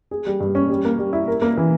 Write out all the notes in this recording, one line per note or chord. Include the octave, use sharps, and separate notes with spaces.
G#4
G3
G2
C#4
G3
A#3
G3
E4
A#4
A#3
E3